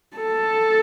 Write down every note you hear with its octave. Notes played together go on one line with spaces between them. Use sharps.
A4